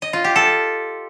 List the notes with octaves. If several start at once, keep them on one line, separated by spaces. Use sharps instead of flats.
D#5
F4
G4
A4